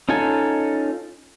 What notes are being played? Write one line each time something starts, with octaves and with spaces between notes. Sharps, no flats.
C#4 D#4 F4 A4 G#5